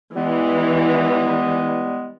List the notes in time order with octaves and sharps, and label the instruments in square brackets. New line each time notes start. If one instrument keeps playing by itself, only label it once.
[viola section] E3 [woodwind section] G3 G#3 B3